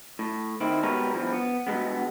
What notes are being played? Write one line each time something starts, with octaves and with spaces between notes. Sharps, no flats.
A2
D#3 C4 E4
B2 G3 G#3 A#4 B4 C#5
E2 G2 E3 F3
B3
E2 G2 B2 G#3 B3